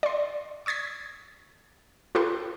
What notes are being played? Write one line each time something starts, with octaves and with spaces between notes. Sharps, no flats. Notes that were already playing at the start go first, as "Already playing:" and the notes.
D5 C6
C#6 D#6 G#6 A6 B6
F4 G4 A4 B4 C6